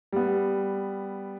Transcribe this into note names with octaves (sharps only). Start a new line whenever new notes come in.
G3 B3